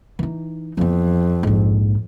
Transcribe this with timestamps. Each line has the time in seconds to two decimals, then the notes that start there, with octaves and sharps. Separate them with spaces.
0.19 E3 D#4
0.77 F2 E3 B3
1.43 A#1 G#2